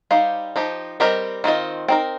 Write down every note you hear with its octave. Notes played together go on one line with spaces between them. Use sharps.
G3 D#4 G4 C5 F5
F3 D#4 G4
G3 C4 G4 A#4 D#5
D#3 C4 F4 D#5
C4 D#4 A#4 G5